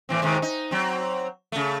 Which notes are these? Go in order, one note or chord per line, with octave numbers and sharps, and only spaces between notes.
A2 E3 C4
G#2 C3 D#3
D#4
F#3 C4
C#3 A3